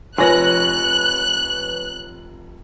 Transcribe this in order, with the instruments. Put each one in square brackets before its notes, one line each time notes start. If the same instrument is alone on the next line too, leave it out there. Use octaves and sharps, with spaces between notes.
[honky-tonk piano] F1 F3 A#6 [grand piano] B4 C#5 G#5 [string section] F#6